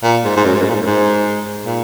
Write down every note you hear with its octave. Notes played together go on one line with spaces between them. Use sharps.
A#2
G#2
G#2
F#2
G#2
F#2
G#2
A#2
G#2
F#2
G#2
A#2